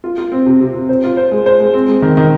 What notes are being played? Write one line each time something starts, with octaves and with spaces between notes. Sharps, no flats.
F4
F4
C4
C3
C3
C3
C5
F4
C5
G#3
C5
G#3
C4
G#3
D#3
D#3